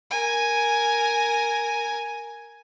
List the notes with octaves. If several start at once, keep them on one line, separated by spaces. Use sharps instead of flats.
A#4 G#5